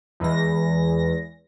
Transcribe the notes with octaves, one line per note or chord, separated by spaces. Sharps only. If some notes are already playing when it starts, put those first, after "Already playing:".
E2 E3 G#3 A#6